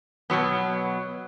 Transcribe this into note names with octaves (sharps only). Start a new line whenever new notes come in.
B2 F#3 B3